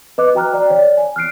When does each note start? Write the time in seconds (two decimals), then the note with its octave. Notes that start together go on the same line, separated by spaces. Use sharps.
0.18 B4 D#5 D6 F#6
0.35 F#4 G5 A#5 F6 F#6
0.53 D5 G5
0.70 C#5 D5
0.97 G#5
1.16 F6 F#6 C7 D7